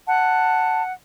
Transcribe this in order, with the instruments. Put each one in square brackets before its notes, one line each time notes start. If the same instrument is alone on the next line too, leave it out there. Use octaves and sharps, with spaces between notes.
[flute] F#5 [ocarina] A5